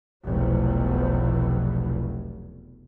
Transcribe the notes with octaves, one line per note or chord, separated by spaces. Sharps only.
F1 B1 E2 B2